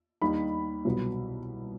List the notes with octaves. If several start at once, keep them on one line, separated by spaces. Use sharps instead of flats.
D#2 D#3 G3 D#4 B5
C2 B2 F#3 B3